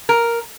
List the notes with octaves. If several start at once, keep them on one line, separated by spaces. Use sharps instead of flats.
A#4